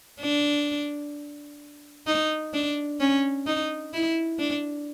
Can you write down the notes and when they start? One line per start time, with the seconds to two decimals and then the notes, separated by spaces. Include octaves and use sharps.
0.21 D4
2.07 D#4
2.54 D4
3.00 C#4
3.46 D#4
3.94 E4
4.39 D4